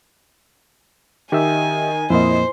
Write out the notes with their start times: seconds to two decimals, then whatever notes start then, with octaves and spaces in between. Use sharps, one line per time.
1.32 D#3 G4 D#5 E5 G#5
2.10 F2 A#2 A#3 E4 F4 C5 D#5